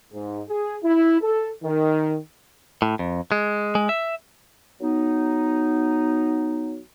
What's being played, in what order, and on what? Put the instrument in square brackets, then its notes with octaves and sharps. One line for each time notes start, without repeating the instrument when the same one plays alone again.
[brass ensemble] G#2
G#4
E4
A4
D#3
[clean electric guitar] A2
F2
G#3
G#3
E5
[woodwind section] F#3 B3 D#4